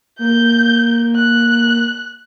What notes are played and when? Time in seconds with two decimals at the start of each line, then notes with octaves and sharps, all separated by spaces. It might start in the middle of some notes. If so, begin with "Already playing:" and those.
0.19 A#3 G6
1.16 F#6